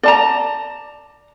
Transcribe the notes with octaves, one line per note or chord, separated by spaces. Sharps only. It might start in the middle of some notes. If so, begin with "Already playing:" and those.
D5 A5 A#5